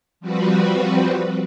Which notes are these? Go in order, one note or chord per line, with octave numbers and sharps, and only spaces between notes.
F3 G3 C4 F#4 B4